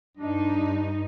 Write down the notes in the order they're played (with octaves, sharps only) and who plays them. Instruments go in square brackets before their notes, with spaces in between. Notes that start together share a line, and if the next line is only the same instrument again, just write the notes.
[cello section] G2 D#4 [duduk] D4